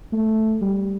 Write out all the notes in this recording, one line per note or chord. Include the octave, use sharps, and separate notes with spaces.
A3
G3